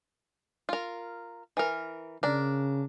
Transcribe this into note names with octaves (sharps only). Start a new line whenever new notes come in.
F4 A#4
E3 A#4
C#3 D4 A#4